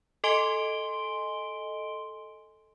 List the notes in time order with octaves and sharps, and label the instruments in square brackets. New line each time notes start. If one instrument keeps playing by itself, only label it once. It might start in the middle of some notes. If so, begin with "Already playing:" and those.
[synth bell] A4 D#5 G#5 C6 D7 G7